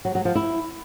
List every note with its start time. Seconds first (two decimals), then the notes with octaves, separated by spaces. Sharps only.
0.05 F#3
0.15 F#3
0.25 F3
0.35 E4